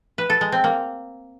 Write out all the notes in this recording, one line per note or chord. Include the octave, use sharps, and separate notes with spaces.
B4
A4
G#3
C4
A#3